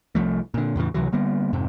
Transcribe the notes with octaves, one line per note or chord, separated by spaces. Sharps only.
C2 F3 A3
A#2 D3
E2 A2 C#3 E3
C#2 C3 E3 F#3
D3 G3 A#3 B3
F2 G#2 C3